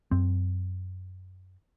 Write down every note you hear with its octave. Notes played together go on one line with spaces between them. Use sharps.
F#2 C4